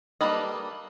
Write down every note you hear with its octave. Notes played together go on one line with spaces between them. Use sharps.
G3 A#3 A4 B4 D#5